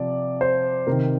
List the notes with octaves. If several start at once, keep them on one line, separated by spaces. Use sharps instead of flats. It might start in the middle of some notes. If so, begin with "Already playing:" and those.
Already playing: C3 F3 D5
C5
C3 D#3 A#4